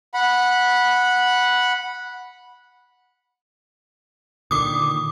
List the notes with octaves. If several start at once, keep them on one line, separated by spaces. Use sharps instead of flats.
F#5 B5
A#2 D3 D#3 D6 D#6